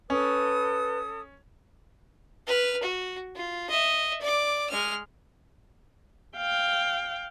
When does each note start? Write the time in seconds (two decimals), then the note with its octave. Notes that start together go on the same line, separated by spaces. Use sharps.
0.10 C#4 A4 B4 D#6
2.47 B4 F6
2.82 F#4
3.35 F4
3.69 D#5 E5
4.21 D5 D6
4.69 G#3 F6
6.37 F5 G5